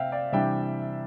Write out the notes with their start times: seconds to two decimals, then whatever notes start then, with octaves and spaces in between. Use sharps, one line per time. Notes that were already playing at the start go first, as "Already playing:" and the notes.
Already playing: C3 C4 E5 F5 G5
0.12 D5 F5
0.32 C3 E3 G3 D4 E5 G5